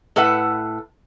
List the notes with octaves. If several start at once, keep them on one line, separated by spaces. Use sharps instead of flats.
A2 A4 B4 E5 F#5